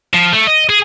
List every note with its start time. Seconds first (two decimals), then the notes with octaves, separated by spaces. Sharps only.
0.14 F3
0.33 A3
0.47 D#5
0.69 G#4